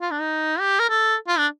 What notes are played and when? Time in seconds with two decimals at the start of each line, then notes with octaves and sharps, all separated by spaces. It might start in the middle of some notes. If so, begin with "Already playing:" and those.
0.01 F4
0.11 D4
0.21 D#4
0.60 G4
0.80 A#4
0.89 A4
1.28 F4
1.38 D4